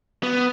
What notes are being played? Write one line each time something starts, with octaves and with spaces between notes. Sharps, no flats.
B3